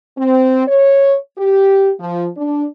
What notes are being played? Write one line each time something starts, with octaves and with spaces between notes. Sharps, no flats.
C4
C#5
G4
F3
D4